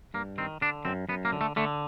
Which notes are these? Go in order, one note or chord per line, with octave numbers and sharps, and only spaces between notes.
G2 A#3
D#3 C4
D3 D4
F#2 C4
F#2 B3
A#3
D3
A3
D3 A3